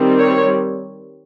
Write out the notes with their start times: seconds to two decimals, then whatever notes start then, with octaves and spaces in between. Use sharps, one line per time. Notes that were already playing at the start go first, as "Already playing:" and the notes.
Already playing: D#3 G3 C4
0.18 C#5